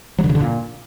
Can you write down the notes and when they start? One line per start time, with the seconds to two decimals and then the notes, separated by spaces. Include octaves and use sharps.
0.19 F#3
0.24 D3
0.29 C#3
0.35 D3
0.40 A#2